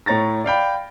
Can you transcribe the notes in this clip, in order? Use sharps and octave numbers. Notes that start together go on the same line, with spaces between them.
A2 C#5 A#5 A6 A#6
D5 F5 G5 B5